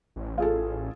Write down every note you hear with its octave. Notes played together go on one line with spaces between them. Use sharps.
A1
F4 G#4 A4